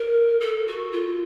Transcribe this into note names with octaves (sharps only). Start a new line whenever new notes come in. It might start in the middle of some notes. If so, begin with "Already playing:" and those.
Already playing: A#4
A4
F#4
F4